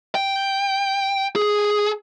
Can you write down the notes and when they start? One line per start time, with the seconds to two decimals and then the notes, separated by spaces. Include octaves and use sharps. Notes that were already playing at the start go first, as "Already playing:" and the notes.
0.15 G5
1.36 G#4